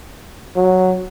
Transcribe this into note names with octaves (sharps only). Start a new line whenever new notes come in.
F#3